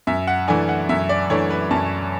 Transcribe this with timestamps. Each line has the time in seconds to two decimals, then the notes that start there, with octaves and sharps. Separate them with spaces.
0.07 F#2 E5
0.27 F#5
0.48 E3 A3 D4 G#5
0.69 F#5
0.89 F#2 E5
1.09 D5
1.30 E3 A3 D4 C#5
1.50 B4
1.71 F#2 A5